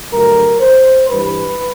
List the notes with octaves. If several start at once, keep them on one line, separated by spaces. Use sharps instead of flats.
G2 D3 F#3 A3 A#4
C5
G2 E3 G3 B4